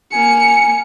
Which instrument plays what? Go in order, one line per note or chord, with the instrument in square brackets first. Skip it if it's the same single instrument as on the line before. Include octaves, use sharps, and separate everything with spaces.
[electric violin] A#3 C#7 [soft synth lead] G#5